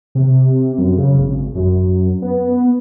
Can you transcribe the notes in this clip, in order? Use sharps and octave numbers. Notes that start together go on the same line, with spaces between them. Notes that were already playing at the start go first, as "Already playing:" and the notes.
C3
F#2
C#3
G#1
F#2
B3